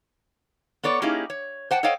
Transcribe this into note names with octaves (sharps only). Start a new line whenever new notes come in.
B3 A4 C#5 D5
A#3 C#4 D#4 E4 G4 G#4
C#5
C5 F#5 G5 A5
A4 C5 C#5 D#5 F5 G5